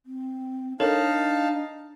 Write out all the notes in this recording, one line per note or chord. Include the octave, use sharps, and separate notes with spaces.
C4
D4 D#4 A4 A#4 C#5 F5 A5